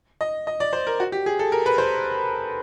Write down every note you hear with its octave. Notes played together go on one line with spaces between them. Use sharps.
D#5
D#5
D5
C5
A#4
F#4
G4
G#4
A4
A#4
B4
C5